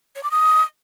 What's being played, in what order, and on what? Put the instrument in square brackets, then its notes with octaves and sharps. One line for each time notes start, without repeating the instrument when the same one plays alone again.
[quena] C#5
D6
D#6